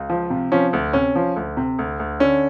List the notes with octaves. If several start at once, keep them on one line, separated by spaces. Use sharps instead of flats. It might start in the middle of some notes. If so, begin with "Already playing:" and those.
Already playing: C#2
F3
C3
F3 C#4
D2
C3 C#4
F3
D2
C3
D2
D2
D3 C#4